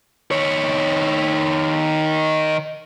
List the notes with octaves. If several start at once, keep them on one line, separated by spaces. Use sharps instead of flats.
D#3 C#5